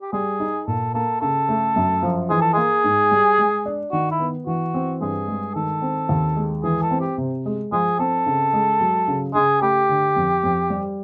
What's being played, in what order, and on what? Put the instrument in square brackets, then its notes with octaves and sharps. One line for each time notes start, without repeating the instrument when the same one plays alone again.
[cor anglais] G4
[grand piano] G3 [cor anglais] G#4
[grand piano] D#4
[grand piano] A#2 [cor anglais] A4
[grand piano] A#3 [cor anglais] A4
[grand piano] C#3 [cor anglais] A4
[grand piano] A3
F#2
F3
[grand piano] E3 [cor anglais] G#4
[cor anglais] A4
[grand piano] A#3 [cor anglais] G#4
[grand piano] G#2
G3
G#3
D4
[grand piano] D#3 [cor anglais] F#4
[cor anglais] E4
[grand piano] B3
[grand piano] E3 [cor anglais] F#4
[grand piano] C4
[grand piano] G2 [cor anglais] G#4
[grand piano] G#3
[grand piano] D#3 [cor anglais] A4
[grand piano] C4
D#2
G#3
[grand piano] E3 [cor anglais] G#4
[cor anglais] A4
[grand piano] C4
[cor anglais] G4
[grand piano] C3
G#3
[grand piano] F3 [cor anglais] G#4
[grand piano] C4 [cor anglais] A4
[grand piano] C#3
G#3
F#3
C#3
[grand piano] C#3 [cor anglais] G#4
[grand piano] A3 [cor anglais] G4
[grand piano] D3
F2
F2
G3